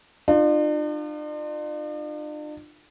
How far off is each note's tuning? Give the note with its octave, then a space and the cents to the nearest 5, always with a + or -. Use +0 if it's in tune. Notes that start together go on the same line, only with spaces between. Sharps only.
D4 +45 F4 +0